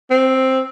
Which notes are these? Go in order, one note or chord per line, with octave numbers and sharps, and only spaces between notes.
C4